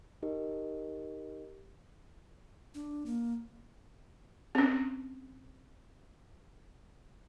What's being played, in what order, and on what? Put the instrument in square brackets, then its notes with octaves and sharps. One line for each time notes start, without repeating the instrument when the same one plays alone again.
[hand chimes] D#4 G4 A#4 D#5
[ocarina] D4
A#3
[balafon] C4 C#4